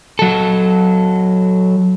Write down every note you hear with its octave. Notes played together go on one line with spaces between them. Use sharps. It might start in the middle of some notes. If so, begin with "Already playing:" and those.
F#3 A4